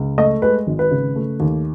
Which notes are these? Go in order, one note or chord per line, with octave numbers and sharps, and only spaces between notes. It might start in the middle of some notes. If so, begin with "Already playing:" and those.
Already playing: C#2
A3 D#5
G#3 B4
G#1
B4
C#3
A3
D#2